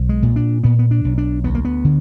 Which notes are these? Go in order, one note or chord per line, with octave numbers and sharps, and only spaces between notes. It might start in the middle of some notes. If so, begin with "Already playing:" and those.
Already playing: B1
G#3
A#2
D4
A#2 B3
B3
D4
B1
D4
D2 B3
A#3
B3
D3